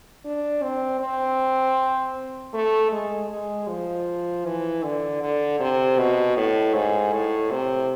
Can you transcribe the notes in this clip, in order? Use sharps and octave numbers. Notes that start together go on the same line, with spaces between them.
D4
C4
C4
A3
G#3
G#3
F3
E3
D3
D3
C3
B2
A2
G#2
A2
C3